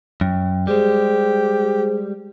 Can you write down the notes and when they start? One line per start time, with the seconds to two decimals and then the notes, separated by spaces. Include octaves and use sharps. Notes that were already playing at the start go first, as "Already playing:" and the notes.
0.21 F#2 G5
0.67 G3 G#3 G4 G#4 C5